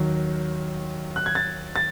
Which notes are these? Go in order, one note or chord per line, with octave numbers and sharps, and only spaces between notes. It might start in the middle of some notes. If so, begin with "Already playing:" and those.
Already playing: D#2 D#3 F#3
F#6
G#6
A6
A6